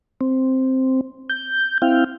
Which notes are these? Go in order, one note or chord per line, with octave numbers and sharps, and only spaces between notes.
C4
G6
C4 E4 F5 G5